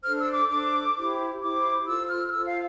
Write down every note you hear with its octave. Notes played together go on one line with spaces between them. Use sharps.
D4 A4 C5 F6
E6
D6
D4 A4 C5 D6
E4 G4 C5
E4 G4 C5 D6
F4 A4 C5 E6
F6
F6
F4 A4 C5 E6
F5